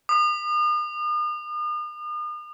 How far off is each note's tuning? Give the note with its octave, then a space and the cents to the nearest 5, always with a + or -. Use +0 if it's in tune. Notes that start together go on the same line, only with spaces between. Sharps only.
D#6 -40